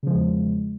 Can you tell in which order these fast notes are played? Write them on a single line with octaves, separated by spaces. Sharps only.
C#3 F3 G#3 E2